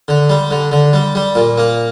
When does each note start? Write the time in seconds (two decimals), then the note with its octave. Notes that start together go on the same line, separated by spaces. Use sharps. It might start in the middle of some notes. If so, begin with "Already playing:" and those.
0.08 D3
0.29 G3
0.51 D3
0.72 D3
0.93 G3
1.15 G3
1.35 A#2
1.58 A#3